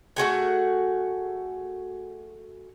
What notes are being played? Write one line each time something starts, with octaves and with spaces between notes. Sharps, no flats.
A3 F#4 G#4 F#5